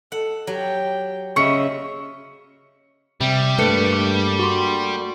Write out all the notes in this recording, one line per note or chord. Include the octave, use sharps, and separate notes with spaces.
A4 F#5
F#3 G4 G5
C#3 D#5 E5 C#6 C#7
C3 G3
G2 A3 A#3 B4 C#7
D6
F#4 C6